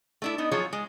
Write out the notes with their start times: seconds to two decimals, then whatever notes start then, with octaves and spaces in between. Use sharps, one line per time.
0.22 A3 D4 E4
0.38 B3 D#4
0.51 F3 F#3 F4 G#4 C#5
0.73 G#3